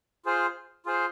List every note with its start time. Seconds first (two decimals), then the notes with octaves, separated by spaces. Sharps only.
0.25 F4 G#4 C5
0.86 F4 G#4 C5